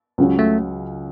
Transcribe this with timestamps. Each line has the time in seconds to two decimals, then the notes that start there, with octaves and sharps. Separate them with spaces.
0.18 C#2 C#3 F#3 C#4
0.39 A3